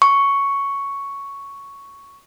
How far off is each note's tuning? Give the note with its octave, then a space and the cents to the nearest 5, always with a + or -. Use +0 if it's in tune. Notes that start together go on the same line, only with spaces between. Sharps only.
C#6 +5